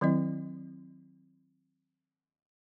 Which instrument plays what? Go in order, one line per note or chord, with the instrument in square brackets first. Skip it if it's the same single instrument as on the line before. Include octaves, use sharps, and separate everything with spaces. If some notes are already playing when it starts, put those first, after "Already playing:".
[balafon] D#3 F#3 C4 E4 D#5